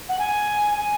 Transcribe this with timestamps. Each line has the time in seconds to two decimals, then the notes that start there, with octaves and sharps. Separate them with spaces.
0.09 F#5
0.19 G#5
0.75 G#5